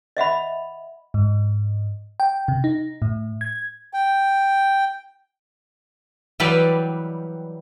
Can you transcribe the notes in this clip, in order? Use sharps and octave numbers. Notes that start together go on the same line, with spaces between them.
D#5 E5 F#5 B5
G#2
G5
C3
D#4
A2
G#6
G5
E3 F#3 G3 B4 D5